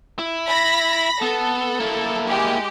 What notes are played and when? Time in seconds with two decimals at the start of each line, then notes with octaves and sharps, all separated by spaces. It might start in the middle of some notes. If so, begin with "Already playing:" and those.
0.19 E4
0.48 B5 A#6
1.22 B3 A4
1.80 A#3 E4
2.28 G#3 G4